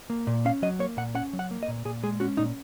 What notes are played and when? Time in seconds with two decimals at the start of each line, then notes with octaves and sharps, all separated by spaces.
0.10 A#3
0.27 A#2
0.45 C#4 F5
0.62 F#3 D#5
0.79 A#3 C#5
0.97 A#2 F#5
1.15 C#4 F#5
1.33 F#3
1.39 F#5
1.51 A#3
1.63 D#5
1.68 A#2
1.85 A#2 G#4
2.03 G#3 G#4
2.20 C#4 F#4
2.37 A#2 D#4